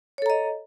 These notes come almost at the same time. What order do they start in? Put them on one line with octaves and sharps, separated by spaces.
C#5 A4 A#5 D#5